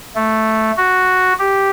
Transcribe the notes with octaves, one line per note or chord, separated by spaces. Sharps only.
A3
F#4
G4